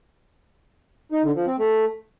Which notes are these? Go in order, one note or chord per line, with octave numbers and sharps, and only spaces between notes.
D#4
D3
F3
C4
A3